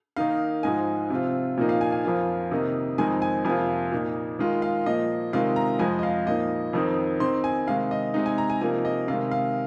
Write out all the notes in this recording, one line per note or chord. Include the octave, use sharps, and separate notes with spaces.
D#3 A#3 D#4 F5
G#2 F3 G#3 D#4 G#5
C3 F3 C4 F4
A#2 F3 A#3 D#4
F5
G#5
G#5
F2 F3 A#3 F4
C3 D#3 A#3 D#4
F2 D#3 G#3 C4 D#4 G#5
G#5
F2 C3 F3 A#3 F4 G#5
A#2 A#3 D#4
D#3 G#3 F4
F5
A#2 F3 A#3 D#5
C3 D#3 G#3 F4 F5
A#5
F2 F3 G#3 G#5
D#5
F5
A#2 F3 A#3 D#4 D#5
F2 D#3 C4 D#4
D#3 C4 D#4 C6
G#5
C3 D#3 G#3 F5
D#5
C3 G#3 D#4
G#5
A#5
G#5
C3 F3 A#3 D#4 G#5
D#5
C3 D#3 G#3 F5
F5